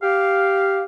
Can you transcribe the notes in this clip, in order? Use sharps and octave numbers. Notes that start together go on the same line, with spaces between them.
G4 F5